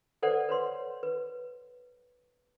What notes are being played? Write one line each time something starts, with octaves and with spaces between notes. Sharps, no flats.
A4 B4 C5 D5 F#5
B4 C#5 C6
B4